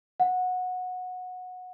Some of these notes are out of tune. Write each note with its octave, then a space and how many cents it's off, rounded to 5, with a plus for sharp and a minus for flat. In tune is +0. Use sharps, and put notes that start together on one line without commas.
F#5 -15